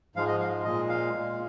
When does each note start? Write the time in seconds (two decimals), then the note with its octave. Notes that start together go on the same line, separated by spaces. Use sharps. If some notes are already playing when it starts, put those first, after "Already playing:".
0.16 G#2 F3 G#3 F5
0.28 D#5
0.40 F5
0.64 A#2 G#3 D#5
0.89 F5
1.13 A#2 G#3